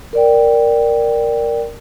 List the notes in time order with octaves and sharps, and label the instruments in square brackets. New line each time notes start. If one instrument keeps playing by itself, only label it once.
[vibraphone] A#4 D5 G5